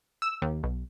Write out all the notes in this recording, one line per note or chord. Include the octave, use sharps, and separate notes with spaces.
E6
D#2
B1